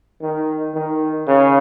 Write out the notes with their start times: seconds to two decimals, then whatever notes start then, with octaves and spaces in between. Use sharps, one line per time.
0.21 D#3
0.74 D#3
1.27 C#3